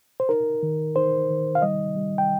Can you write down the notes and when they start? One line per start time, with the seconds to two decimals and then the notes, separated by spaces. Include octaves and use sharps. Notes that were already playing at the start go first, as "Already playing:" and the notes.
0.20 C5
0.29 D#4 A#4
0.63 D#3
0.96 D#4 C5
1.30 D#3
1.55 F5
1.62 G3 D#5
1.96 G3
2.18 G5